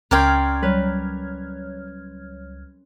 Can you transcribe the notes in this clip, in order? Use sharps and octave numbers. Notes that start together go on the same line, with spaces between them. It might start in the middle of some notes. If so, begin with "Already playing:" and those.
C#2 C#4 A#4 D5 G5 C6 F6 G#6
F#3 G3 B4 C#5